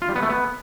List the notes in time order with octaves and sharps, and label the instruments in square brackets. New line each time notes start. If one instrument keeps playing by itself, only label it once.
[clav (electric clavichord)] F4
G3
B3
A3
B3